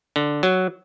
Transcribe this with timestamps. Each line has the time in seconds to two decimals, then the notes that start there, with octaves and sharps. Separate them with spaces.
0.16 D3
0.43 F#3